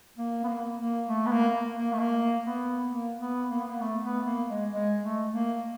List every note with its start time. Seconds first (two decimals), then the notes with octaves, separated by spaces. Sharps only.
0.18 A#3
0.44 B3
0.48 A#3
0.79 A#3
1.09 A3
1.26 B3
1.32 A#3
1.54 A#3
1.77 A#3
1.93 A3
1.99 A#3
2.45 B3
2.90 A#3
3.20 B3
3.51 A#3
3.60 B3
3.70 A#3
3.81 A3
4.03 B3
4.27 A#3
4.50 G#3
4.72 G#3
5.02 A3
5.33 A#3